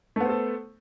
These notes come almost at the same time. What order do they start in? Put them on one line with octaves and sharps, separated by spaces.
A3 B3 C5 A4